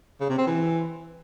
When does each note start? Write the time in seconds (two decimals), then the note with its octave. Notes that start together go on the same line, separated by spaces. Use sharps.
0.20 C#3
0.29 C3
0.38 C4
0.47 E3